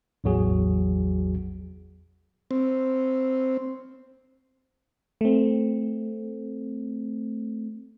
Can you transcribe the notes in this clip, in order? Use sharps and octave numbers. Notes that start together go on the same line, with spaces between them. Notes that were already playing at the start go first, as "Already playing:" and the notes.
A1 E2 F#3 F#4 G#4
C4
A3 C4